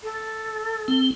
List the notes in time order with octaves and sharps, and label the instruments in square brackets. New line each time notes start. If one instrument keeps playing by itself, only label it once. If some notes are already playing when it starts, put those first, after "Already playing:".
[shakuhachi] A4
[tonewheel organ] C4